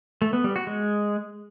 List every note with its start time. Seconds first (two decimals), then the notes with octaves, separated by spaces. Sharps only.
0.22 A3
0.33 B3
0.44 G3
0.56 F#4
0.67 G#3